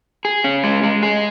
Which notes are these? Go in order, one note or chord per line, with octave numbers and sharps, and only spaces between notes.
G#4
C#4
G#3
G#3
G#4